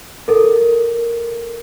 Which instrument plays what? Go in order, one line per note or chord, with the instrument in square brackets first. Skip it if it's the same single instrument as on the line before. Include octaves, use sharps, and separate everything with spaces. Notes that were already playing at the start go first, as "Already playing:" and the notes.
[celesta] A4 A#4